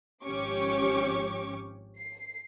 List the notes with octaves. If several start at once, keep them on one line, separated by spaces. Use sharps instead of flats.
G#1 F3 C#4 G4 C#6 D6
C7